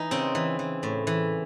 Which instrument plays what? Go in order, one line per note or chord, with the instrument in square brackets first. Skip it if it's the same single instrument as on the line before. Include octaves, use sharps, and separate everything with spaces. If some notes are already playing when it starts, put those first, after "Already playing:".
Already playing: [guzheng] E3 D#4
C#3 C4
E3
E3
A2
E3